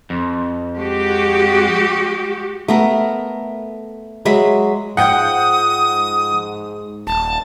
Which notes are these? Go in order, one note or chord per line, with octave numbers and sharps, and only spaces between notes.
F2
G#3 F#4 G4
A3 B3 A#4
F#3 G#3 E5 B5
G#2 F3 F#5 G5 D#6 G6
D#1 A5